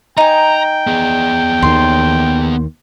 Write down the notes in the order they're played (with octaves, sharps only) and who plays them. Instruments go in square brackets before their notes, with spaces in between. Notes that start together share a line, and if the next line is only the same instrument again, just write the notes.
[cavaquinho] D#4 G#5 [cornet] G5 [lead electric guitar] A#5
[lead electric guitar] B3 G#4
[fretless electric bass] D#2 D#3 [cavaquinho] C6